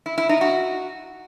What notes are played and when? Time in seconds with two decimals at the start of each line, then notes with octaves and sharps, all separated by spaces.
0.06 E4
0.18 E4
0.29 D#4
0.41 F#4